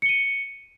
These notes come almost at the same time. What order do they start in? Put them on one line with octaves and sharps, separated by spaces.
C#7 G7 D#7